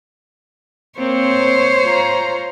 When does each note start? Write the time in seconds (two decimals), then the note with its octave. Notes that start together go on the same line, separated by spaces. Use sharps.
0.98 A#3 C4 C5 C#5
1.85 F4 A#5